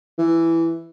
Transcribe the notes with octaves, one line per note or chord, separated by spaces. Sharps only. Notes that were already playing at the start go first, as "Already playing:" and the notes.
E3